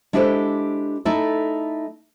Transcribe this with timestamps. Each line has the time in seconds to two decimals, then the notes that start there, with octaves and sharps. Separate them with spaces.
0.13 G#3 D4 E4 G4 A4 C5
1.05 A3 D#4 E4 A4